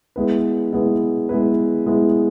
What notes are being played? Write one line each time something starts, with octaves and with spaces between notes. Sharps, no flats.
G#3 B3 E4 B4
G#3 B3 E4 B4
G#3 B3 E4 B4
G#3 B3 E4 B4